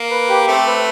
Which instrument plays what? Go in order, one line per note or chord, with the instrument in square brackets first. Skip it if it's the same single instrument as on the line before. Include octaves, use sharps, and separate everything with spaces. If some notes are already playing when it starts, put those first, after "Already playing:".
Already playing: [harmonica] A#3
[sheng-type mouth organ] B4
G4
[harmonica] A3 [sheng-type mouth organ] C4
[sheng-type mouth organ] B4